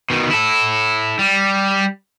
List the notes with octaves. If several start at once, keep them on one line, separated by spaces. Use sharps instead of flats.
B2 D#3
E4 A4
G3